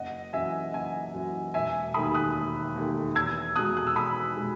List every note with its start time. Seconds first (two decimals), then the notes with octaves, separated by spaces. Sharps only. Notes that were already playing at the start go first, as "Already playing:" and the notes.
Already playing: F#1 D#5 F#5
0.33 F#2 E3 E5 G#5
0.73 F#1 E5 G#5
1.14 F#2 E3
1.54 E1 E5 G#5
1.94 D#2 D#3 A3 B5 D#6
2.14 D#6 F#6
2.35 E1
2.76 D#2 D#3 A3
3.15 E2 E6 G#6
3.56 B2 G#3 D#6 F#6
3.77 F#6
3.87 E6
3.96 E2 B5 D#6
4.37 B2 G#3